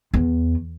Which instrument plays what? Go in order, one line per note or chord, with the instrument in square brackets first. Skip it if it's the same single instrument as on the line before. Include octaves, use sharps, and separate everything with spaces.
[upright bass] E2